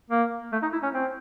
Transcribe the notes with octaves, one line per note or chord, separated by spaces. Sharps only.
A#3
A3
D#4
E4
C#4
C4